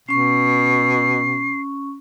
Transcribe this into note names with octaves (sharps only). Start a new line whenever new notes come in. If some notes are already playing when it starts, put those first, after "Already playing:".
B2 C#4 C#6 C7